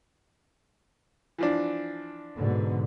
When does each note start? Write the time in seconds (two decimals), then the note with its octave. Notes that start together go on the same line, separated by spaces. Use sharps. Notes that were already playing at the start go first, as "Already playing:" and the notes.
1.38 E3 F3 D4
2.36 G#2 B2 D3